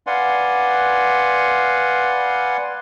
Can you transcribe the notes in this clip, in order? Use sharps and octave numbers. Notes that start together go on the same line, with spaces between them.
B4 D5 F5 F#5 G#5 C6